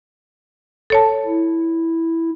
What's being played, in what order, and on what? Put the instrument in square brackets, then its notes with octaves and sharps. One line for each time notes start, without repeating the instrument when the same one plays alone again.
[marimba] A4 C#5 A5
[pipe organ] E4